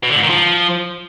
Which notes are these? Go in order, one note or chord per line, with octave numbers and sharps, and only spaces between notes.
B2
D3
G#2
D#3
F3